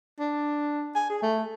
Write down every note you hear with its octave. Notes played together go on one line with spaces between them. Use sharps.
D4
G#5
G#4
A3